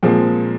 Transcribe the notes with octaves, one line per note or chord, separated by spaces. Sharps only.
A#2 F3 G#3 C4